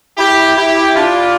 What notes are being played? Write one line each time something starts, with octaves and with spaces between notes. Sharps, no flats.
E4 G4
E4 G4
D4 F4